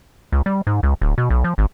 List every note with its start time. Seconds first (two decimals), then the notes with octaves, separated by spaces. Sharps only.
0.32 C#2
0.46 G3
0.67 G#2
0.83 C#2
1.01 D1
1.18 B2
1.30 B1
1.44 F3
1.58 G#1